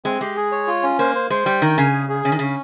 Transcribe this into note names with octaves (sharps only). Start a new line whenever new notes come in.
G#3 C4
G#3 G4
G#4
C#5
F4
C#4
A#3 C5
C5
G#3 C5
G3 G5
D#3 A#4
C#3 G#5
G#4
G#4
C#3 C#4
D#3
C#3 C#4